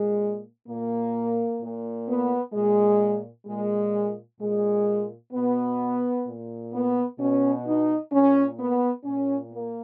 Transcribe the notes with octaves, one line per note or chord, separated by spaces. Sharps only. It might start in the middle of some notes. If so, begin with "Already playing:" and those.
Already playing: A#2 G#3
A#2 A#3
A#2
B3
A#2 G#3
A#2 G#3
A#2 G#3
B2 B3
A#2
B3
B2 C#4
D#4
A#2 C#4
B3
A#2 C#4
A#3